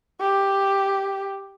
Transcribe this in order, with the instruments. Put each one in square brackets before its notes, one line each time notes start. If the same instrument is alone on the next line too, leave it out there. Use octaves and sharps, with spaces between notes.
[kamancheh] G4